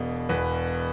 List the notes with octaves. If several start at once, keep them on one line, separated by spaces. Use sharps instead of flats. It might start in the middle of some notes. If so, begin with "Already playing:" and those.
Already playing: E1 B2
E2 B4